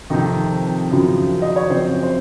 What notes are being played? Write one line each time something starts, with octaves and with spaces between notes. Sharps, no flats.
F2 C3 D#3 F3 D#4
F#2 C#3 F3
D#5
C#5
F#2 C#3 F3 C4 C5
C5